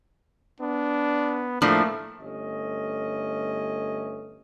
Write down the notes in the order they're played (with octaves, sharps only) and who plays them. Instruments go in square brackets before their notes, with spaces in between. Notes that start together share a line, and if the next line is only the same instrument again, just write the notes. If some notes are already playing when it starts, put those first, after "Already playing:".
[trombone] B3 [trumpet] D4
[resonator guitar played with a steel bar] A2 F3 D4 [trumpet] A3 [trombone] A#3
[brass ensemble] G1 A3 C#4 D#5